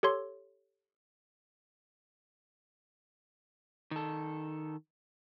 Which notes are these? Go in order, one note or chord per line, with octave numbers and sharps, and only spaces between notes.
G4 A4 C#5 C6
D#3 A4